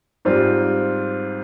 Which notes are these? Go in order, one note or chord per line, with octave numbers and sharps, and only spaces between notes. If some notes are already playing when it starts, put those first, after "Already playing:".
G#2 G3 C4 F4